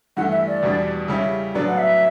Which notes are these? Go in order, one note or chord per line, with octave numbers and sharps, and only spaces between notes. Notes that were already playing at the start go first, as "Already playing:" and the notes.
G2 E3 A3 F#5
E5
D5
E2 B2 G3 D4
C#3 G3 C#4 E4
A2 F#3 B3 D4 D5
F#5
E5